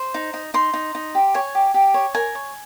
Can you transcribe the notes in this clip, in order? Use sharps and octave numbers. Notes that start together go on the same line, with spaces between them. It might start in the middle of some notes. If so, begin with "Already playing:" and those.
Already playing: C5
D#4
D#4
D#4 C6
D#4
D#4
G4
C#5 G#5
G4
G4
C#5
A#4 G#5
C#5